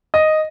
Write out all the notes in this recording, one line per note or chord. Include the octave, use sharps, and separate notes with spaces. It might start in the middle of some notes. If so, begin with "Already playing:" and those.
D#5